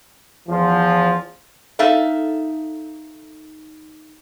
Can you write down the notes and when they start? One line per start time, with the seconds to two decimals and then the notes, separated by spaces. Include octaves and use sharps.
0.49 E2 F3
1.79 D#4 A4 E5 F5